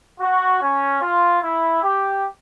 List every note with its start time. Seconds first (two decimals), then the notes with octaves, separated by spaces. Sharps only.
0.20 F#4
0.61 C#4
1.01 F4
1.42 E4
1.82 G4